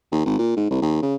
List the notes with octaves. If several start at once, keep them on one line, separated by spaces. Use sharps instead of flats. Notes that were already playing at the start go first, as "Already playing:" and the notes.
D#2
G#1
A#2
G#2
C2
D#2
C#3